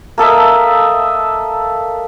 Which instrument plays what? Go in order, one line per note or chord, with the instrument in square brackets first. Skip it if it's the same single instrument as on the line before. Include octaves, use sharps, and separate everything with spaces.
[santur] A#3 A4 D#5 E5